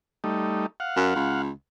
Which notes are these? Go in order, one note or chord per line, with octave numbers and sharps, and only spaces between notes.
G3 A3 D#4
F5 F#5
F#2
C#2